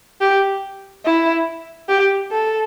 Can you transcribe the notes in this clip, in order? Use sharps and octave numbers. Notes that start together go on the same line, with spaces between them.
G4
E4
G4
A4